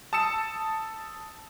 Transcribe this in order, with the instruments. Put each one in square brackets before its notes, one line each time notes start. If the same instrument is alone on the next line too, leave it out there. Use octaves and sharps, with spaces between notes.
[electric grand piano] A5 D#6 E6 C#7 E7